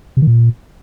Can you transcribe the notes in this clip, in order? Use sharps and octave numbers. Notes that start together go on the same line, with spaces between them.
C3
D#3
A#2